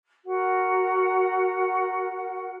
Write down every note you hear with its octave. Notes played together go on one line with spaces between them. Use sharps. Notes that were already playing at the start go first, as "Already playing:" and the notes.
F#4 A#4 F#5